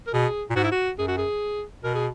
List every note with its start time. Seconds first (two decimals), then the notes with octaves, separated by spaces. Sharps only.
0.07 A#4
0.13 B2 G#4
0.50 A#2
0.56 G#2 F#4
0.64 E4
0.71 F#4
0.98 F#2 G#4
1.08 F#4
1.17 G#4
1.84 B2 A#4
1.95 G#4